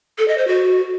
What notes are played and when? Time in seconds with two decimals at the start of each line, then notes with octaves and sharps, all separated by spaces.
0.18 A4
0.28 D#5
0.38 C5
0.48 F#4